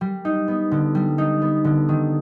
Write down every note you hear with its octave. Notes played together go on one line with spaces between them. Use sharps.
G3
D#4
B3
D3
G3
D#4
B3
D3
D#3